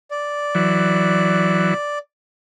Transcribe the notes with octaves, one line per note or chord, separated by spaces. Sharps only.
D5
E3 F#3